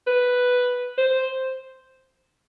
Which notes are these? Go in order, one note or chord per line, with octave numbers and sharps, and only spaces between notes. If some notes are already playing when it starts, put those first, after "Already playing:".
B4
C5